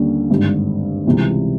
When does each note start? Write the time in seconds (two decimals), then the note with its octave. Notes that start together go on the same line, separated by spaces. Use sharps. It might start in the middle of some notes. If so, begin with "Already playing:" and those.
Already playing: D#2 D3 G3 A#3 C#4
0.30 G#1 G2 D3
1.05 C#2 C3 E3 G3